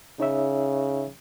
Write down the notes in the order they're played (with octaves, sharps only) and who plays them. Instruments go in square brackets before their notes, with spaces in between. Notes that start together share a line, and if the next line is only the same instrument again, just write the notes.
[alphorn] C#3 [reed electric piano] D#4 C#5 E5